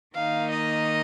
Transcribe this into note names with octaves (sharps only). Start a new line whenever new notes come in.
D#3 A#3 D#4 F5
D#5